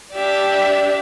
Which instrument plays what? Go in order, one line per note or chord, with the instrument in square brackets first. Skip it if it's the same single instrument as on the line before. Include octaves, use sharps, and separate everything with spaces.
[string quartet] D4 G4 D5 E5